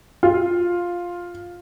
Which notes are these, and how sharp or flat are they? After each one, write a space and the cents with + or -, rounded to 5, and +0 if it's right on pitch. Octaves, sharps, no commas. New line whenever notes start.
F4 +5